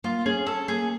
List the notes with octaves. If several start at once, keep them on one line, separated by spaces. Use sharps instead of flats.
A#3 F4
C#4 G#4
C#4 A4
A#3 G#4